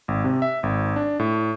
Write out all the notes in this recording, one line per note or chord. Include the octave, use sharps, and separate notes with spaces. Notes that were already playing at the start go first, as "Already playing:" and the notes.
G#1
C3
E5
G#1
D4
A2